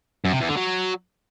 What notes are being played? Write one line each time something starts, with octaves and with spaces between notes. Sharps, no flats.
F#2
C3
E2
D3
F#3